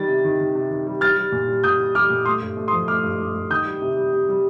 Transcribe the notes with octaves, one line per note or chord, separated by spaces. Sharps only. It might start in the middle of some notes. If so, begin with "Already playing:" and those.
Already playing: D#3 G3 A6
C3
D#3
D#3
C3
D#3
G3
G3 F6 A6
G3
A#2
G3
A#2 D#6 G6
G3
G3 D6 F6
A#2
A3 C6 D#6
G2
A3
C6 D#6
F3
A3 D6 F6
G2
G2
G2
D#3 D#6 G6
G3
C3
G3
C3
G3